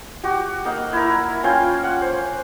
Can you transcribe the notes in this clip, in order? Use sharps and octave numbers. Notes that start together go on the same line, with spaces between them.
F#4 G4
A#3 D#4 F#5
E4 A#4
C#4 F4 F5 G5
F#5
C5